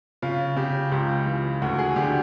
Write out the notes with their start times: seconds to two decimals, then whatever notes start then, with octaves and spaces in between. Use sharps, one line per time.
0.22 C#3 F4
0.56 C#3 G4
0.92 C#2 G4
1.26 E3
1.62 D2 F#4
1.79 G#4
1.96 D3 G4